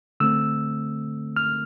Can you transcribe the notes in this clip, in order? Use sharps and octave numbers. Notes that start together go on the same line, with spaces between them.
D3 A3 C4 E6
F6